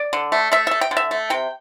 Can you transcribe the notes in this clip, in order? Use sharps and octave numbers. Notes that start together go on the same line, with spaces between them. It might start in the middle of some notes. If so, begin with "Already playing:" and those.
Already playing: D5
D3
A3
A3 E5
A3 E5
G5
D3
E5
A3
C3 G5